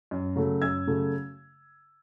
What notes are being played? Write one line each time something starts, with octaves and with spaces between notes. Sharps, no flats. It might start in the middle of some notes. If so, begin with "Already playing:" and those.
F#2
C#3 F#3 A3
F#2 E6 G#6
C#3 F#3 A3